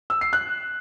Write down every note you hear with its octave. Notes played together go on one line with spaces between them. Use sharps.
E6
C7
F#6